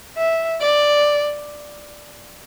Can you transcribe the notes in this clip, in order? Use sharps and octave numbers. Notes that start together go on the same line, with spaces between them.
E5
D5